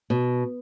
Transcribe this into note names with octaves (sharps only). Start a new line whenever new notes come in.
B2